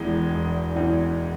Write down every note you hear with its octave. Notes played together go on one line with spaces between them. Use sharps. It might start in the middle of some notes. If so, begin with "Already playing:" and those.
Already playing: E1 E2 E3 G#3
E1
E2 E3